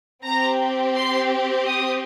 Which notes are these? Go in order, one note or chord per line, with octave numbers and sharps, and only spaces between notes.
C4 G4 A#5
C6
D#6